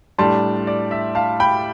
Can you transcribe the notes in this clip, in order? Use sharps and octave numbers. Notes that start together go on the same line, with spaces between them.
A2 G3 D4 A5 C6
D5
E5
F5 A5
G5 B5